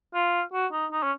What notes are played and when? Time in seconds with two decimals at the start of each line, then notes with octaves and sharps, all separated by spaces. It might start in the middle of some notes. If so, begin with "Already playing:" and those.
0.14 F4
0.53 F#4
0.72 D#4
0.92 D#4
1.03 C#4